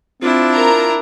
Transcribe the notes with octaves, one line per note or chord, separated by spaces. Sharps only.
C4 D4 E4 F4
A#4 A#5